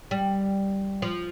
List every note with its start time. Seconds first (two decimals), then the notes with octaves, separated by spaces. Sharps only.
0.11 G3
1.02 F3